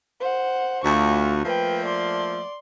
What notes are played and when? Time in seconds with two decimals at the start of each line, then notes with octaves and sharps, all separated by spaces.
0.20 C5 F#5
0.84 D2 F4 C#6
1.45 F3 A3 A#3 B4 G5
1.85 D5 C6